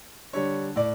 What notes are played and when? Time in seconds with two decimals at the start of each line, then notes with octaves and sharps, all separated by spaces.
0.33 D3 G3 C#5
0.76 A2 D5